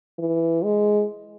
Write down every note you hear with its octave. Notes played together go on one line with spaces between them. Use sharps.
E3
G#3